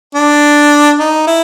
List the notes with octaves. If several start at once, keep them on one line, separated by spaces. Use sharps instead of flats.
D4
D#4
E4